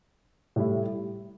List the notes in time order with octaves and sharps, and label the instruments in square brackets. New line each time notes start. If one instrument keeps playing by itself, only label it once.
[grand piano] A2 G3 E4